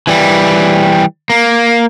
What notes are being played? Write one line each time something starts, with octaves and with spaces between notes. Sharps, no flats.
E3 G3
A#3